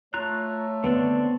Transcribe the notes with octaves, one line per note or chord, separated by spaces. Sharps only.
A3 F4 C#5 A#5 F#6
D3 B3 C4 D4